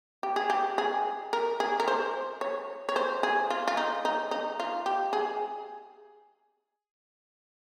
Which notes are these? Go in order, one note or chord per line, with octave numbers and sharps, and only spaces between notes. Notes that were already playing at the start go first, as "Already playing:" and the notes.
G4
G#4
G4
G#4
A#4
G#4
A#4
C5
C#5
C#5
C5
G#4
F4
F4
D#4
D#4
D#4
F4
G4
G#4